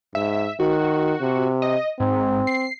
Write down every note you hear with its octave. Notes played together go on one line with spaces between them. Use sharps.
G#2 E5
D#3 F#4
C3
D#5
G#2 C4
C7